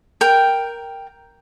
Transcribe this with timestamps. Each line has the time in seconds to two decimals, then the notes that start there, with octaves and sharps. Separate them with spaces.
0.21 A#4 G5